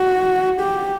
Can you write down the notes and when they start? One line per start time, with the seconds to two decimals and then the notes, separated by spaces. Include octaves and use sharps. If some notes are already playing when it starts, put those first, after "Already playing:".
Already playing: F#4
0.61 G4